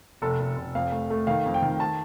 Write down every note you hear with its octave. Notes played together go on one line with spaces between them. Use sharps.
F1 A4
F1
F1
F2 F5
A3
A3
D#3 F5
F2
G5
D#3
A5